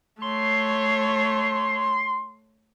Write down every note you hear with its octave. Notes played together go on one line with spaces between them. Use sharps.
A3 C#5 C6